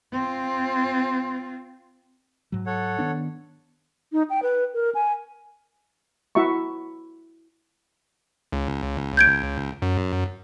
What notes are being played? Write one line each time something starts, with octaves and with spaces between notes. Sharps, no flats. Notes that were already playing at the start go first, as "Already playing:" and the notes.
C4 F4
G#2 F#3
A4 C#5 F#5
D#3 B3 D4
D#4
G5
B4
A#4
G#5
E4 F#4 E5 A#5 C#6
C#2
G6 G#6 D7
F#2